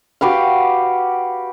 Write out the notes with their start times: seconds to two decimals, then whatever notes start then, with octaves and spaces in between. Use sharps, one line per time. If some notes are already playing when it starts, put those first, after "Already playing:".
0.21 F#4 G4 B4 F5